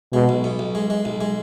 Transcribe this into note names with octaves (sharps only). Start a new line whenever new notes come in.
B2 G#3
B1
B2
B1
G#3
G#3
B1
G#3